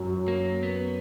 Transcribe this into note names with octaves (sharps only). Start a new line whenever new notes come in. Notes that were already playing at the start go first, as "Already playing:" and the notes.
Already playing: F#2 F#3
A#3
B3